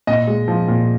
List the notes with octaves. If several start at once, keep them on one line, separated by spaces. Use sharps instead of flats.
A#2 D#5
G#3
F3
A#2